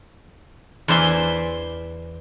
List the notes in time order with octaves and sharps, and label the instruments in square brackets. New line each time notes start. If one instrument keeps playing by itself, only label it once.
[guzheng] E2 C5 D5 E5 G#5 C6